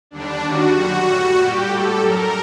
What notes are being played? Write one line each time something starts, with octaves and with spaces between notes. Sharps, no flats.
D#2 D3 G3 D4
D#2 D#3 G3 F#4
F#2 D3 G3 F#4
A2 G3
A#2 G3 G4
A2 G3 A4
F#2 F#3 A#4